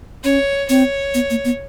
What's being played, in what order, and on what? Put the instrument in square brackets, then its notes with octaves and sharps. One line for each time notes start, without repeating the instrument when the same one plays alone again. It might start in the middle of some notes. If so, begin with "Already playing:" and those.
[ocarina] C#4 [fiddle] C#5
[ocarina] C4 [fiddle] C#5
[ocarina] B3
A#3
B3